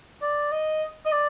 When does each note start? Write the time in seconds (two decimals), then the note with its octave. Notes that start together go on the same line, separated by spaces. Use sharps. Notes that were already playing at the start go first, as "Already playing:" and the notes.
0.22 D5
0.52 D#5
1.06 D#5
1.12 D5